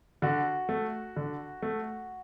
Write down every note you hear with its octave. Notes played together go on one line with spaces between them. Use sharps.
D3 F#4
A3
D3
A3